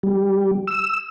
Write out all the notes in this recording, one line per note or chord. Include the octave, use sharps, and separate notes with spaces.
G3
E6